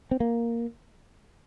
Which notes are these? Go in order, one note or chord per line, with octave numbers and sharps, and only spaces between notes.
C4
A#3